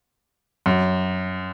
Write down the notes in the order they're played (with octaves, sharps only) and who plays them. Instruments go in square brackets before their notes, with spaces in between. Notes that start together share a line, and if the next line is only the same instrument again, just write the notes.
[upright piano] F#2